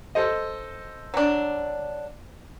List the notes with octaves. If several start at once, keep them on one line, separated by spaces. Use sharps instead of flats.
A4 C5 D#5
F#3 D4